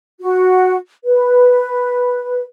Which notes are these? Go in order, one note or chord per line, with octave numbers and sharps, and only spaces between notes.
F#4
B4